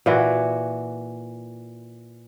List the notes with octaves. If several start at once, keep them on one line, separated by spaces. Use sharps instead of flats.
A#2 E3 F#4